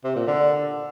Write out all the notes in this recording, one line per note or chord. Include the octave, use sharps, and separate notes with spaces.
C3
A#2
D3